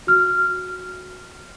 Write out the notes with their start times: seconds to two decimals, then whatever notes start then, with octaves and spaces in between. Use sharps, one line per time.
0.07 F#4 F6